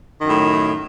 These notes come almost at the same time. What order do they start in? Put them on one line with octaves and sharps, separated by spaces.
D#3 F#2 A2